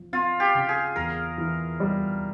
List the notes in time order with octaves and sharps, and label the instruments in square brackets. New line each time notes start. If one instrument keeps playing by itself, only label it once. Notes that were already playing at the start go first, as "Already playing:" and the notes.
Already playing: [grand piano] F3
[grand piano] C4 [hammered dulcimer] F4
[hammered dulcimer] G4
[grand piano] C#3
[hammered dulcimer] G#4
[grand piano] E2 [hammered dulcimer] A#4
[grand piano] E3
G3